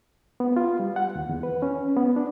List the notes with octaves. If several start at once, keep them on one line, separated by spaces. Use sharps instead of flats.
B3
F4
G3
F#5
D#2
E2
B4
C#4
B3
D4